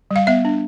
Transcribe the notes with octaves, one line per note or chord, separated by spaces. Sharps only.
G3
F5
B3 E5
D4